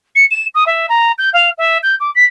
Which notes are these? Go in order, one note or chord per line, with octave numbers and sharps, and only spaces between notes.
C#7
E7
D#6
E5
A#5
G6
F5
E5
G6
D6
B6